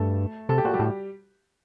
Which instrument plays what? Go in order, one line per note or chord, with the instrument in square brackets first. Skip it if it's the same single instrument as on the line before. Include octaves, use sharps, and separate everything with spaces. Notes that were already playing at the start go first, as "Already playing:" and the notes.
Already playing: [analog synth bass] G2 [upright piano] A3 A4
[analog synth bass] C3 [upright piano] A4
[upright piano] G4
[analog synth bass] A#2 [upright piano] F#4
[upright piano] G3 G4
[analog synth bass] A2